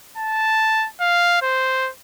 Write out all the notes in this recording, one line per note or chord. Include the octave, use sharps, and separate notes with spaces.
A5
F5
C5